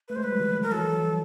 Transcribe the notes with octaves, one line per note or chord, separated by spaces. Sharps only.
A3 B4
G#3 C5
G3 B4
F#3
D#3 F3
A#4
E3 F#3 A4
F3 G3